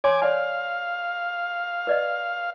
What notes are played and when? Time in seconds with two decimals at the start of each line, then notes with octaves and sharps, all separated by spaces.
0.04 C#5 G#5 C6 D6
0.22 C#5 D5 F5 G#5
1.87 B4 D5 D#5